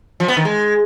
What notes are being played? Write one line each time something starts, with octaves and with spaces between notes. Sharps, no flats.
F3
B3
D#3
G#3